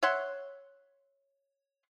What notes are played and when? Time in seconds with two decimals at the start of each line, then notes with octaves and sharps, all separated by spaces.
0.03 C#5 E5 F#5 C6